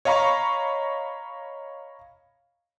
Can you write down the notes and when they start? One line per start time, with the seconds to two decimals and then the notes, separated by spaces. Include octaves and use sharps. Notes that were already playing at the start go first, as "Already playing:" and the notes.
0.05 C#5 D#5 F5 A#5 B5 C#6